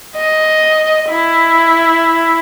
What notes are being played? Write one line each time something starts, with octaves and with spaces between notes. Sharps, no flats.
D#5
E4